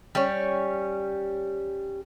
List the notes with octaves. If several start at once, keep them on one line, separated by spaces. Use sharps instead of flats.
G3 C#4